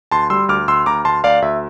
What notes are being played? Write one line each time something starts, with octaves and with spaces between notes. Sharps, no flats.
D2 A5 C6
G3 C6 E6
D2 D6 F6
D2 C6 E6
D2 A#5 D6
D2 A5 C6
D2 D5 F5
D2 E5